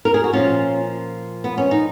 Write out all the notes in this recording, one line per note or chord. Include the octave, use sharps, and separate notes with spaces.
A#4
G#4
F#4
A#2 F3 A#3 C#4 F4
B3
C#4
D#4